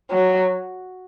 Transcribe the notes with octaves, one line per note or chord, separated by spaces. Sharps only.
F#3